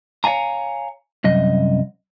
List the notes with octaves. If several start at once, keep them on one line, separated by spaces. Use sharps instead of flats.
C#5 D5 F5 G#5 A#5
C2 F#2 D#5